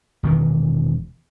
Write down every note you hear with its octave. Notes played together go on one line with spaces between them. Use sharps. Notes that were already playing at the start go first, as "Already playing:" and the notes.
E1 D#3 E3